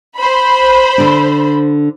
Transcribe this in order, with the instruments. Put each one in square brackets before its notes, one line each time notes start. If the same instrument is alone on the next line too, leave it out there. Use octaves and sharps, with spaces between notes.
[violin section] C5 B5
[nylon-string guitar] D3 D4